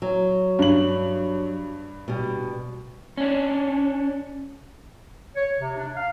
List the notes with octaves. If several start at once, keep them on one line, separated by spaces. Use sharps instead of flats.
F#3
G2 F#7
B2 G3
C#4 D4
C#5
C3
D4
F5